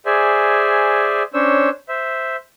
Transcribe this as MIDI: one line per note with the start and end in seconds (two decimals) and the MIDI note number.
0.06 1.23 68
0.06 1.23 72
0.06 1.23 74
0.06 1.23 76
0.06 1.23 80
1.34 1.69 61
1.34 1.69 62
1.34 1.69 72
1.34 1.69 73
1.34 1.69 88
1.89 2.36 72
1.89 2.36 76